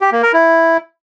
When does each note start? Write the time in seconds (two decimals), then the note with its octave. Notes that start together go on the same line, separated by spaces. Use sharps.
0.01 G4
0.12 A#3
0.23 A#4
0.33 E4